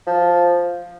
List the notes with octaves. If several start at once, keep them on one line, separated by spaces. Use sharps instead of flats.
F3